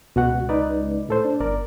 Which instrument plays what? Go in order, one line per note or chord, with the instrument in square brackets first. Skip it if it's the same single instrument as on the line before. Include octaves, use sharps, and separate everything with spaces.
[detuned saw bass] C#2 [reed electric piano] B2 F#4 F#5
[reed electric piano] D#4 B4 D5
A2 A4 C5
[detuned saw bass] D4
[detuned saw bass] G1 [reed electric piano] A#4 D5